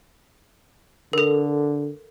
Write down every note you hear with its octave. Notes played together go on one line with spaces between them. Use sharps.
D3 A4 A#4